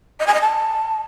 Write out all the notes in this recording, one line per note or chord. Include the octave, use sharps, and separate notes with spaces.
D#5
G#5
D#5
A5